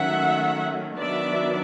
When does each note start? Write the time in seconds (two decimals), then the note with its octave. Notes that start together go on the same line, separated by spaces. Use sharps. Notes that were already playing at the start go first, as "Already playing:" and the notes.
Already playing: D#3 F#3 A3 C#4 E5 F#5
0.98 D#3 F#3 B3 D4 D5 E5